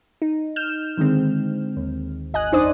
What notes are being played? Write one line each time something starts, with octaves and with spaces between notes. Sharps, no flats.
D#4
F6 G6 E7
D3 D#3 G#3 C4
D#2
G#1 D#5 G#5 F#6
F2 D4 D#4 C5 D5 D#6